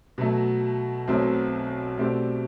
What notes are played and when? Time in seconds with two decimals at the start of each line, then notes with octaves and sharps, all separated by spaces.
0.18 B2 F#3 A3
1.07 B1 B2 F#3 A3 C4
1.97 B2 A3 C4 G4 D5